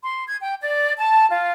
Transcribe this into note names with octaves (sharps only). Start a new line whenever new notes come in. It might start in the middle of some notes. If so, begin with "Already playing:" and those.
C6
G#6
G5
D5
A5
F4